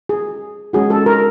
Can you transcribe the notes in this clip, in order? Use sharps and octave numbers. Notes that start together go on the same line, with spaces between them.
G#4
G#3 C#4 F#4 G#4
A4
A#4